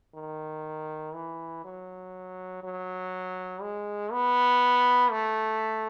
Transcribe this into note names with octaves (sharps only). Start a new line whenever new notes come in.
D#3
E3
F#3
F#3
G#3
B3
A3